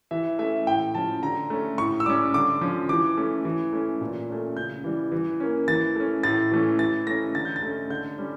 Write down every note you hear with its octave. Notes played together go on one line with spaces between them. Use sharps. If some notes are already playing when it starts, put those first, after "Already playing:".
E3 E5
A3 C#4 E5
A2 G5
F3 C#4 A5
D3 A#5
A3 C#4
A2 C#6
E6
G3 C#4 D6
D3 D6
F3 C#4
E3 D6
A3 C#4
E3
A3 C#4
A#2
A3 C#4
C#3 G6
E3 G3
E3
A#3 C#4
E3 A6
A3 C#4
A2 A6
E3 A3 C#4
E3 A6
A3 C#4 A#6
D3 A6
G6
A6
A3 C#4
D3 G6
G3 C#4